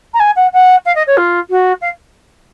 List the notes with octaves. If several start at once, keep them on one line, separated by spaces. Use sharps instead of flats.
A#5
G#5
F#5
F#5
F5
D#5
C#5
F4
F#4
F5